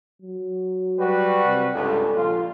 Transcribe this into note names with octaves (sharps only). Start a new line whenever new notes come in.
F#3
G3 F#4 B4
C3
C#2 G2 A4
A#1 F4